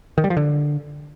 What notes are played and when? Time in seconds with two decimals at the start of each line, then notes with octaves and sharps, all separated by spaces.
0.18 D#3
0.24 G3
0.30 F3
0.37 D3